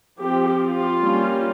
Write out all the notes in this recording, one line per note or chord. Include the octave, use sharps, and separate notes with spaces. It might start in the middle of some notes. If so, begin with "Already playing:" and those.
F3 C4 G4
F4
G3 A#3 C#4